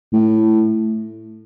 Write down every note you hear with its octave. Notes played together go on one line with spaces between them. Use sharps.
A2